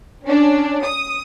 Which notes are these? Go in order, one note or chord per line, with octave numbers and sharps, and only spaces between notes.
C#4 D4
D#6